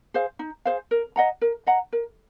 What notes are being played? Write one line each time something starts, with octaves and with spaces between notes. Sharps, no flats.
G#4 C5 F5
D#4
G#4 C5 F5
A#4
D#5 F#5 A#5
A#4
D#5 F#5 A#5
A#4